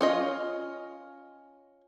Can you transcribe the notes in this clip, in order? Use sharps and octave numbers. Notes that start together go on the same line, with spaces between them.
C#4 F4 D#5